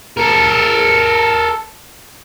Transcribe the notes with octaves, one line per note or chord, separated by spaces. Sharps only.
A4 A#4